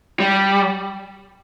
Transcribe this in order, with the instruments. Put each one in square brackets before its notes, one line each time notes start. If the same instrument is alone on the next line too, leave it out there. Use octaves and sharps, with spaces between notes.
[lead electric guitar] G3